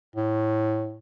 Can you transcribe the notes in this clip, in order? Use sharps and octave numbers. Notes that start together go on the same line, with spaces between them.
A2